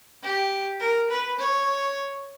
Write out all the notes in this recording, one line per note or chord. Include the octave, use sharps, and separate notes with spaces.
G4
A#4
B4
C#5